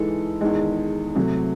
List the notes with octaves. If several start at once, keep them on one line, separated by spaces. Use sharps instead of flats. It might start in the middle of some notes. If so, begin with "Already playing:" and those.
Already playing: G#2 E3 G#3 A4
E2 D#3 G#3
C3 F#3 A3